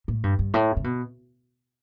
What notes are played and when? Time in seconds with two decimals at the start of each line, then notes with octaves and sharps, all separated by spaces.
0.08 A2
0.23 G2
0.39 G2
0.54 A2
0.77 C#3
0.84 B2